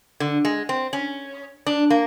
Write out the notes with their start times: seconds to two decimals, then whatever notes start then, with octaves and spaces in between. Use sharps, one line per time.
0.20 D3
0.45 G#3
0.69 C4
0.93 C#4
1.67 D4
1.90 A#3